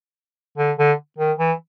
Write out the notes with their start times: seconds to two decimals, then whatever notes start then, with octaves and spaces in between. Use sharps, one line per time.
0.58 D3
0.78 D3
1.18 D#3
1.39 E3